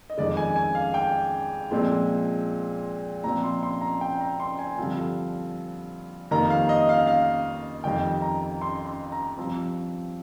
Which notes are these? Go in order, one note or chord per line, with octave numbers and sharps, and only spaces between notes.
D#5
F2 D#3 G#3 D5
G#5
G#5
F5
G5
A#2 F3 G#3 C4
A#2 F3 C4 A#5
C6
C6
A#5
G5
A#5
C6
G#5
G2 D3 F3 C4
F2 D#3 G3 A#3 A#5
F5
D#5
F5
F5
F2 D#3 G3 G5
A#5
C6
C6
A#5
G2 F3 C4